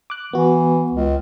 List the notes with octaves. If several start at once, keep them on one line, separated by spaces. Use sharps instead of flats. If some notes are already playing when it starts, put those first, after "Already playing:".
D6 F#6
E3 B3 F#4
C#2